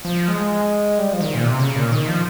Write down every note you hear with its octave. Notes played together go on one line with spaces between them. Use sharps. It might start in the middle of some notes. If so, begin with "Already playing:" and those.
F3
G#3
G3
F3
D#3
A#2
C3
C#3
A#2
D#3
F3